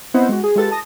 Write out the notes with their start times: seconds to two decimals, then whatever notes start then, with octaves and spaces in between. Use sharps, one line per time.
0.14 B3 C4 E4 C5 D#5 F#5
0.29 G#3 F#4
0.43 G#4
0.56 G#3 F4 G4 A4 B4 A6
0.71 A5 D#6 A#6